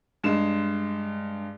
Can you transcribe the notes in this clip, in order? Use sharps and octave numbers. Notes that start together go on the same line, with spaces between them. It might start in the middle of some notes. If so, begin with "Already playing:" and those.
G2 G#3 E7